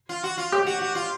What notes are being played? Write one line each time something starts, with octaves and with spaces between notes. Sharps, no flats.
F4
F#4
F4
G4
F#4
F#4
F4